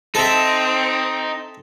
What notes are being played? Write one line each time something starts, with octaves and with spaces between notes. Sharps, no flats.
C4 D#4 A4 E5